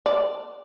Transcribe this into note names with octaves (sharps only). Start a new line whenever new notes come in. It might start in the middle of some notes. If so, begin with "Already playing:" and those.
D5